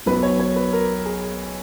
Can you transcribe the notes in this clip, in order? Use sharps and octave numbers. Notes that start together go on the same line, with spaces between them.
B1 B2 F#3 B4
C#5
C#5
B4
A#4
G#4